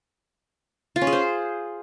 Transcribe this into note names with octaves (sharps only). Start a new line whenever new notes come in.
F4
C#4
G#4
C5